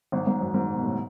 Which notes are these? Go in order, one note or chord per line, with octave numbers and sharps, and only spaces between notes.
G#1 G#2
G#1 G#2
F#2
G#1 G#2
B2
A2